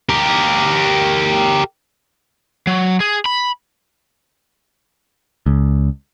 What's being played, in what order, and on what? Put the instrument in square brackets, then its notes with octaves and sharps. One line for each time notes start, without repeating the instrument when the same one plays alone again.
[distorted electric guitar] G4 A#4
[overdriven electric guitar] F#3
G#4
B5
[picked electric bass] C#2